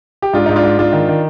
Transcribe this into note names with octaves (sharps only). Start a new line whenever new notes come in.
G4
G#2 D4 F4
G#2 D#4
D4 F4
G#2
G#2 D4 F4
D#3
D#3